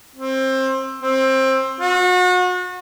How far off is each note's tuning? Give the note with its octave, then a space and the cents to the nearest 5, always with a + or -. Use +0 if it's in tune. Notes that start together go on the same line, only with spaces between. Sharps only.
C4 +20
C4 +20
F#4 -35